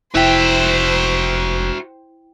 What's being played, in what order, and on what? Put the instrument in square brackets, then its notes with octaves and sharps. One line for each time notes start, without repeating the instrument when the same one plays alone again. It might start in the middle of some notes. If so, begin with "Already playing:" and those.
[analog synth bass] F1 [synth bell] E4 G5 [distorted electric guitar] F#4 E5 [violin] C5